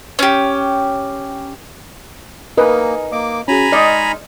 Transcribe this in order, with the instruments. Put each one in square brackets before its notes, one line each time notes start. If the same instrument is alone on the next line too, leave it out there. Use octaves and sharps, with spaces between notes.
[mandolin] C#4 G4
[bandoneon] A#3 [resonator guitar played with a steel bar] D#4 [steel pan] A#4 B4 [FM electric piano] D#5 G#5
[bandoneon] A#3 D6 [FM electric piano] D#5
[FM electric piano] C#4 F#4 G#4 [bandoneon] G#5 A#5 B5
[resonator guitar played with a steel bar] G#3 D#4 D#5 [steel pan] D5 [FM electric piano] F6